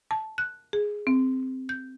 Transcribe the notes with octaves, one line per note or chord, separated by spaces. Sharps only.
A5
F#6
G#4
C4
G6